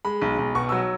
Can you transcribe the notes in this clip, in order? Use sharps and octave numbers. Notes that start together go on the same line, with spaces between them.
G#3 B5
B1
B1
B2 C#6
F#3 E6